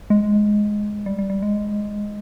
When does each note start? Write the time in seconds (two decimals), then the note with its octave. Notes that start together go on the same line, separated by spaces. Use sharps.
0.10 G#3
1.06 G3
1.19 G3
1.30 G3
1.42 G#3